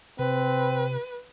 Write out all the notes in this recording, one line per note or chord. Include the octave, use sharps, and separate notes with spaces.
C3 C4 B4